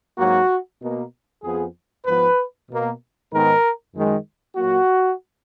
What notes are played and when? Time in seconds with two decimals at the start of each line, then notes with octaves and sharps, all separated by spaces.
0.18 G#2 F#3 A#3 F#4
0.81 B2 A#3
1.43 F2 F3 B3 G#4
2.06 G#2 F3 B3 B4
2.69 B2 A#3
3.32 G#2 D#3 G#3 B3 A#4
3.93 F#2 D#3 G#3
4.56 A#2 F#3 A#3 F#4